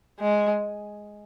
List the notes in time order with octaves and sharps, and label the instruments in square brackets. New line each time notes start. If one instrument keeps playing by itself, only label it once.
[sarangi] G#3